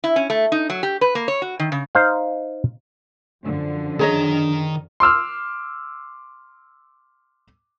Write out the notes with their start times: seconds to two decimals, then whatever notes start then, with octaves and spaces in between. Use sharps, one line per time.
0.04 E4
0.16 C#4
0.30 A3
0.52 D#4
0.70 F#3
0.83 G4
1.01 B4
1.15 A#3
1.28 C#5
1.42 F#4
1.59 D#3
1.72 C#3
1.95 D#4 C5 F5
3.43 F#2 D3 F3
3.99 D#3 D4 G#4 C#5 D#5 A#5
5.00 C6 D6 E6 F6